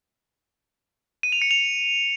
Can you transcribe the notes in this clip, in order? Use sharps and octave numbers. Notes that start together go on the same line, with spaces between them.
D#7
F7
C#7
F7